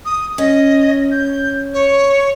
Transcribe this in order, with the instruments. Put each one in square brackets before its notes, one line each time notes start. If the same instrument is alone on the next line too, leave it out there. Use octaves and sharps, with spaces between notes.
[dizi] D#6
[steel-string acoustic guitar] C#4 [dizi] D#5
[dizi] G6
C#5